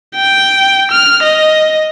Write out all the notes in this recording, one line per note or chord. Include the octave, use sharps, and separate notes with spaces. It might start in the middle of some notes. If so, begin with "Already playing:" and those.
G5
F6
D#5